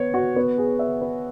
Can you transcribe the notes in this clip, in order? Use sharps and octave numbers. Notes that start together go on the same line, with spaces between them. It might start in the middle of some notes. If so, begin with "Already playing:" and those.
Already playing: B3 C#5
F#4
B3
G#4
E5
B4